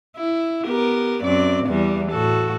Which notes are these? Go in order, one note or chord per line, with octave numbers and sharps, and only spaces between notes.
E4
B3 G4 A#4
F#2 C4 D5
E2 E3 G3
A2 F#4 A4